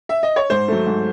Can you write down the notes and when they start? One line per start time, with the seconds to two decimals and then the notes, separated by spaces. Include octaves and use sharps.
0.09 E5
0.23 D#5
0.36 C#5
0.50 G#2 C5
0.68 F#3 A3
0.86 G#2